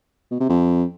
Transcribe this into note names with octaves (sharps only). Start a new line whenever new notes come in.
B2
C3
F2